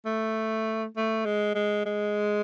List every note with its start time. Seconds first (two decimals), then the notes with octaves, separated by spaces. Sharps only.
0.06 A3
0.96 A3
1.25 G#3
1.55 G#3
1.86 G#3